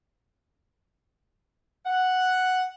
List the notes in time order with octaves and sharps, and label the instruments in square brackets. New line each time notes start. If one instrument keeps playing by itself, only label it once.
[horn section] F#5